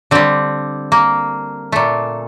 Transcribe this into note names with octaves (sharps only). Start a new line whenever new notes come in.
D3 G3 C4
A#3
A#2 A3